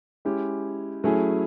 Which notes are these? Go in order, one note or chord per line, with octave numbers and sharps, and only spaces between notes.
G#3 C#4 E4 G4
F#3 A3 C#4 E4 G#4